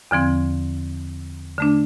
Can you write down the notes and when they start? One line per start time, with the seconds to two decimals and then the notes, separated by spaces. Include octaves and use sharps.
0.11 E2 D3 F3 C4
1.58 D3 A3 D4